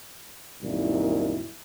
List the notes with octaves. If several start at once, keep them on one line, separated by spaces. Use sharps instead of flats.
C2 F#2 A#2 D#3 E4